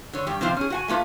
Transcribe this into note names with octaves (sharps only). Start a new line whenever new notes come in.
D3 C#5
G2 G4
C3 F3 C4 F4
C#4 G#4
F#4 F#5 G#5
A3 A#3 F4 B4